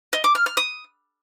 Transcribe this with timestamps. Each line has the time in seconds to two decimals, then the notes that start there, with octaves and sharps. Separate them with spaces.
0.13 D#5
0.24 D6
0.35 F6
0.46 F6
0.57 D#6